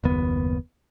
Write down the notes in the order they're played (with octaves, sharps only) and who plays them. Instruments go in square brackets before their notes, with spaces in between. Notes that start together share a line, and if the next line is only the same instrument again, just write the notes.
[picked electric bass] F#1 D#2 B3